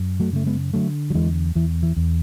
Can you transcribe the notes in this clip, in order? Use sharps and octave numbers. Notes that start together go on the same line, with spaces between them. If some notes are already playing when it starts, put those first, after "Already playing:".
Already playing: F#2
F#3 A3
C#3 A3
G#3 B3
D3 F#3 A3
F#3
E2 E3 G#3
E2 E3
E3
E2